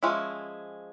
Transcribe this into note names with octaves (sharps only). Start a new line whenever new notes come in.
F3 G#3 C#4 E4